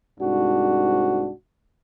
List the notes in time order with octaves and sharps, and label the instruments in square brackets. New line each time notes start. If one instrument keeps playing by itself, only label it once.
[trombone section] C2 G#2 D4 F#4